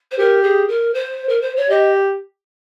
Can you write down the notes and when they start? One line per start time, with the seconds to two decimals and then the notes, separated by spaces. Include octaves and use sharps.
0.11 C5
0.18 G4 A#4
0.43 G#4
0.69 A#4
0.94 C5
1.29 A#4
1.42 C5
1.57 C#5
1.70 G4 D#5